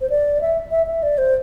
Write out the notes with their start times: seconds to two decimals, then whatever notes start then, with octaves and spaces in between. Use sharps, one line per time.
0.01 C5
0.10 D5
0.41 E5
0.71 E5
0.87 E5
1.03 D5
1.18 C5